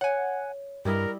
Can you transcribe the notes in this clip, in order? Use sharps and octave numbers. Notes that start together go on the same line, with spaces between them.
C#5 F#5 G#5
G2 G3 E4 A#4 D#5